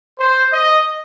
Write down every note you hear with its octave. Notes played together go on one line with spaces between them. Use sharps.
C5
D#5